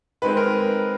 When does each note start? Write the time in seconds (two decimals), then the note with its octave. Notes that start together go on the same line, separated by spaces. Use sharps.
0.22 D#3 G#3 C4 B4
0.37 A#4